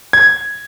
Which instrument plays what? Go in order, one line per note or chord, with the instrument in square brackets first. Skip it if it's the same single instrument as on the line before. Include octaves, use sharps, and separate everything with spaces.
[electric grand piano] G#6